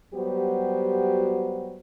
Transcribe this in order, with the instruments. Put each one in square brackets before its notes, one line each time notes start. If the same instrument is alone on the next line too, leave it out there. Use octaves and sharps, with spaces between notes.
[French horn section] F#3 G3 B3 F#4 G4 C5